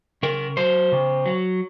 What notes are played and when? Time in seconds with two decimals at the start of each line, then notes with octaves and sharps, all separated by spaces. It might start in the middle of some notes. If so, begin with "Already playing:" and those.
0.23 C#3 A#4
0.57 F#3 C5
0.92 C#3
1.26 F#3